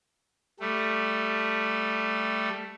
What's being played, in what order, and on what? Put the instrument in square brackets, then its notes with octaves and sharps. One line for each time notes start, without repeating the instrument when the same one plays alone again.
[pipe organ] G3 A3